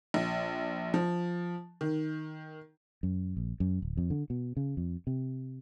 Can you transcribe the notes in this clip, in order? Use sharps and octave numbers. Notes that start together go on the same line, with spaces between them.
A#1
F3
D#3
F#2
A#1
F#2
D1
F2
D3
B2
C#3
F2
C3